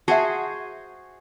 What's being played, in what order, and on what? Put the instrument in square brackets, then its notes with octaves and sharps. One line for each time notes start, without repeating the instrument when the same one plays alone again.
[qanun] F#4 G#4 C5 [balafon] E5 F#5 A5